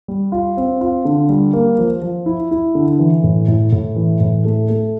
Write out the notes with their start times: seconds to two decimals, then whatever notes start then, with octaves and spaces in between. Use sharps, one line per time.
0.08 G3
0.32 F4
0.57 C4
0.81 F4
1.05 D3
1.29 G3
1.53 A#3
1.78 F3
2.02 F3
2.26 E4
2.51 E4
2.75 D3
2.99 E3
3.24 A2
3.48 A2
3.72 A2
3.96 E3
4.20 A2
4.45 A3
4.69 A3